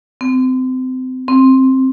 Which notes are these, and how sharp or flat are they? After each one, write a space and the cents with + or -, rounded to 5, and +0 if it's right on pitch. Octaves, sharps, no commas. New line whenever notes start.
C4 -30
C4 +10